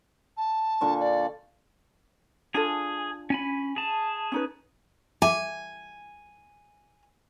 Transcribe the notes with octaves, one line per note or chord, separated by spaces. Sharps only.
A5
A#2 D3 C#6
D5
D4 F4 G#4 A4 G#5
C#4 G#5 B5
G#4 A5
C#4 D#4 B4
E5 G#5 D6